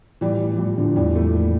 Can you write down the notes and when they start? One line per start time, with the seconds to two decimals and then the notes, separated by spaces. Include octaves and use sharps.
0.21 A2 E3 G3
0.40 A2
0.52 F3
0.59 A2 E3 G3
0.78 A2 D3 F3
0.96 E2 E3 G3
1.15 E3 F3 A3
1.34 A#3